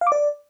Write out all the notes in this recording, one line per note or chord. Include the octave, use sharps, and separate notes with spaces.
F5
D6
D5